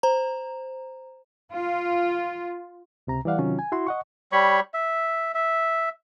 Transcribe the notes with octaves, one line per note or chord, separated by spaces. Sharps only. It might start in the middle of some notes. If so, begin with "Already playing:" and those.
C5 A#5
F4
C#2 C3 A#5
E3 G3 D5 F5 F#5
C3 D#3 F#3 C#4 F4
G#5
E4 F#4 C6
D#5 F#5 C#6
G3 C#5 B5 C#6
E5
E5